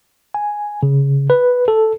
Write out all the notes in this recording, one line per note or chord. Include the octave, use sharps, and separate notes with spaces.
G#5
C#3
B4
A4